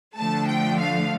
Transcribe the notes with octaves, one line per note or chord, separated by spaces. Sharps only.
D3 F3 A3 A5
G5
F5